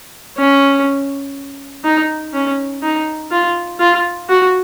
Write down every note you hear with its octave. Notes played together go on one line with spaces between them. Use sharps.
C#4
D#4
C#4
D#4
F4
F4
F#4